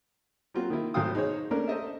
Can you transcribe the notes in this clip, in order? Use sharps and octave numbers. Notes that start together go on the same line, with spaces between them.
F#3 A#3 C4 F4 F#4
D#3 A#3 E4
G#1 A2 F#3 F5 G5 D#6
D#4 G#4 C5 C#5
A3 A#3 C#4 D4 A#4
A4 C5 D#5 E5